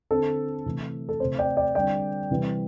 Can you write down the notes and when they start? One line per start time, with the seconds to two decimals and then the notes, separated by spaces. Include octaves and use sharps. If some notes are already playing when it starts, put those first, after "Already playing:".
0.11 D3 C4 A4
0.66 C3 E3 A3
1.09 A4
1.20 C3 A3 C4 C5
1.39 D5 G5
1.57 D5 G5
1.75 D3 G3 C4 D5 G5
2.31 C3 E3 G3 C4